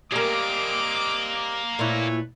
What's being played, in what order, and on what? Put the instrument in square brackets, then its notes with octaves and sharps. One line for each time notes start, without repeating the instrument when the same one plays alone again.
[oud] G3 A#4 [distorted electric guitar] A#3 G#4 [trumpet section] C4 D#5 D6
[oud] A#2 E4 [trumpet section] A3 B4 C#5